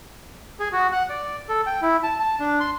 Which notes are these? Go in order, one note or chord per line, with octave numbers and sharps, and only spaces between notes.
G#4
F#4
F#5
D5
A4
G5
E4
A5
A5
D4
C6